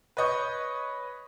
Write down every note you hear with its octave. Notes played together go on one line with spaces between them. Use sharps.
B4 C#5 D#5 C#6 G6